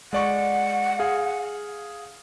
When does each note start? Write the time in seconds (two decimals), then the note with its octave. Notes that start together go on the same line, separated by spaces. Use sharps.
0.13 G#3 D5 F#5 C#6
0.99 G#4 F5